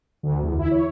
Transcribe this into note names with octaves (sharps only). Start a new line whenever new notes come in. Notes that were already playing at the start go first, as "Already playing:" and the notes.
D2
E2
E4
C#5